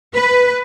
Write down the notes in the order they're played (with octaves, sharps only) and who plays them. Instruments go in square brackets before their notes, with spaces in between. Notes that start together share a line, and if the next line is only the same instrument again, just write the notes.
[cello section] B4